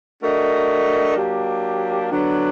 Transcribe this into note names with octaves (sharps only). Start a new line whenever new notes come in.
A3 D4 F#4 A#4 D#5
F#3 A#3 D4 G4
D3 F#3 B3 D4